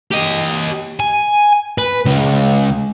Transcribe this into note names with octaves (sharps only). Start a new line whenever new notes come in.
G4 D#5
G#5
B4
C#2